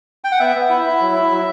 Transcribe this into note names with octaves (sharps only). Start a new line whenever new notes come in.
G5
F#5
B3 E5
B3
E4
E4
F#3
E4
F#3